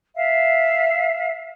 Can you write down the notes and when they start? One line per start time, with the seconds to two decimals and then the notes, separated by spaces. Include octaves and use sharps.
0.15 E5 F5